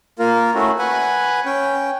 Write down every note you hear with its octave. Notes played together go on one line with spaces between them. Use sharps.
A#3 F4 A#4
A3 C#4 E4 F#4
B4 F#5 G#5
C#4 G5